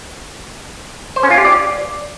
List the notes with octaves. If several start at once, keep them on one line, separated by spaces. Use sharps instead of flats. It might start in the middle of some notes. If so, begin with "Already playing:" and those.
C5
C#4
F4
G4
D5